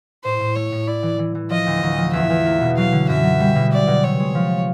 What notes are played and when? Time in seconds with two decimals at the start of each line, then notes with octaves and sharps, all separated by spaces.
0.24 A2 C5
0.40 A2
0.55 A3 C#5
0.72 A2
0.87 E4 D5
1.03 E3
1.19 E3
1.35 E3
1.50 F3 D#5
1.66 D2
1.83 D2
1.98 F3
2.13 E2 E5
2.30 E2
2.46 A#3
2.61 B2
2.77 F#3 F5
2.92 D3
3.09 F#2 E5
3.24 F#3
3.40 G3
3.55 B2
3.72 C2 D5
3.87 B2
4.03 C3 C#5
4.20 G#3
4.35 F3